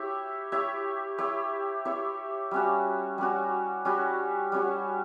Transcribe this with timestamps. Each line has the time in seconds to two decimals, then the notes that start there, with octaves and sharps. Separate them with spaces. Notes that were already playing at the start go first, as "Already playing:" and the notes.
Already playing: E4 G4 C#5 E5
0.52 E4 G4 C#5 E5
1.18 E4 G4 C#5 E5
1.85 E4 G4 C#5 E5
2.51 G3 C#4 F#4
3.18 G3 C#4 F#4
3.85 G3 C#4 F#4
4.52 G3 C#4 F#4